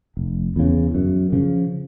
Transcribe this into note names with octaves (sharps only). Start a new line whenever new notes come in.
F1
E2 C#3
F#2
C#3 F3